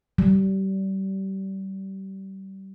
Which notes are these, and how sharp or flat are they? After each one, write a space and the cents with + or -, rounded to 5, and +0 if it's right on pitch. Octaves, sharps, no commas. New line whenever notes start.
G3 -30